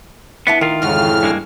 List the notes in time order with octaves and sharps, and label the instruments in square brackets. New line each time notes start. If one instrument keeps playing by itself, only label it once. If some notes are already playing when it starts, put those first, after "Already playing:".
[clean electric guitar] B3 [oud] D4 E4 A4
[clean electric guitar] D#3 F4 [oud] A#4
[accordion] F2 C#3 F6 [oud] G#2 E3 F#4
[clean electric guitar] G2 G#3 A#3